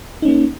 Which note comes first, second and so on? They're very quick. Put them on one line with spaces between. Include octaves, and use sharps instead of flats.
D#4 C#4 A#3